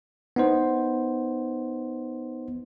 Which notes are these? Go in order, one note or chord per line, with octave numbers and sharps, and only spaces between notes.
B3 D#4 C5